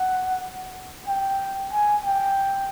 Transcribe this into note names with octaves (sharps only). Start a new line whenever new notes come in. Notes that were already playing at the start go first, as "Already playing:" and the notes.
Already playing: F#5
G5
G#5
G5